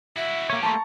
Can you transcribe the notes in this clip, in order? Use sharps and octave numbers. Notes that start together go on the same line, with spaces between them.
E4 F#4 E5
A#3 C#4 G4 C#5
A3 A#3 A5 A#5 C6 C#6